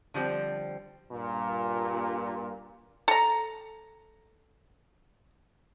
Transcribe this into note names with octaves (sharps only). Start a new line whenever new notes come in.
D3 F3 G3 C4
G2 A#2
A4 A#5